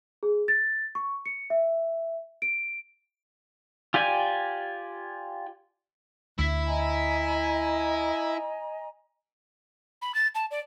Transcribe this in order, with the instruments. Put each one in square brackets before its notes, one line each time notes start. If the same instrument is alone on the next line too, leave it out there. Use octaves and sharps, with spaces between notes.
[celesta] G#4
A6
C#6
C#7
E5
D7
[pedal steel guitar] F4 G4 D5 G#5
[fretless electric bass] D2 [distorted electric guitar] E4 E5
[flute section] D#5 G#5 A#5
[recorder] B5
A6
A5
D5